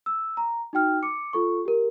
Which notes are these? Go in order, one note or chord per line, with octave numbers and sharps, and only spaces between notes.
E6
A#5
D#4 F#4 G5 F6
D6 C#7
F4 A4 C#6
G4 A#4